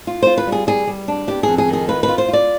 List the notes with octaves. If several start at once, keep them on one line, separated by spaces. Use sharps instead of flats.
F4
F4 C5
B4
G3
G#4
G3 G#4
G3
D4
B3 G4
F2 G#4
G#4
D#3
G#4
F4 B4
B4
F4
C5
F4
D5